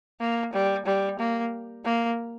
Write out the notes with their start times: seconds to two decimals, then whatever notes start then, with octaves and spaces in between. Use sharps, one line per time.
0.20 A#3
0.53 G3
0.86 G3
1.19 A#3
1.85 A#3